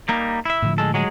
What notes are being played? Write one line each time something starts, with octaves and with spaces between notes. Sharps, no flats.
G3 A#3 D#4
E4 E5
A2 D3 F3
G#3 A4
F#3 G#3 G#4